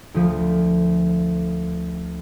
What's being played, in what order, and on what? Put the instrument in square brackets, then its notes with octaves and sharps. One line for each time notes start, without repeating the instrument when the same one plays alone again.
[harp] D2 F3